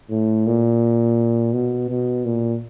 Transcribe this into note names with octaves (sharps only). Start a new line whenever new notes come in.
A2
A#2
B2
B2
A#2